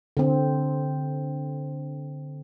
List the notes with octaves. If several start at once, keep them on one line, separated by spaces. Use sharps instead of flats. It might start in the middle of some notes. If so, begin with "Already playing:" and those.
D3 C4